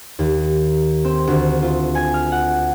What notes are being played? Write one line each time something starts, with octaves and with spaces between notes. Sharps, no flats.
D#2
C4
D2
F4
G#5
F6
F#5